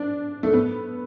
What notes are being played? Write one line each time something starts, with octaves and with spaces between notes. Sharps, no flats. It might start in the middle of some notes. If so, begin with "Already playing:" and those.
Already playing: D4
A3
B3